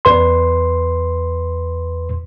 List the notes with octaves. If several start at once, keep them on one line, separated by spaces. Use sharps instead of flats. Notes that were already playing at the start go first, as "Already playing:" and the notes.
E2 B4 C6